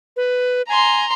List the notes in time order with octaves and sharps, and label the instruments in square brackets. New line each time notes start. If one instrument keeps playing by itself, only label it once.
[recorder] B4
[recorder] G#5 [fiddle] A#5 C6